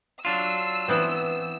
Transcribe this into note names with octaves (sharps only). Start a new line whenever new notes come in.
F#3 D4 F4 E6
E3 B3 C4